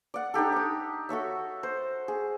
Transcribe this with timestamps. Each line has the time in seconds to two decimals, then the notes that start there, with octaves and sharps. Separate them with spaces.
0.14 D5 F#5
0.34 D4 D#4 G4 A4
0.52 A#5 D#6
1.09 F#4 A4 C#5 E5
1.63 C5
2.08 G#4